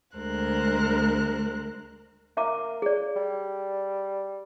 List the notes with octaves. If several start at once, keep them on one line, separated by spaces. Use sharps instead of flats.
D2 G#3 A#4 C5 F#6
A#3 E5 A#5 D6
G#4 D5
G3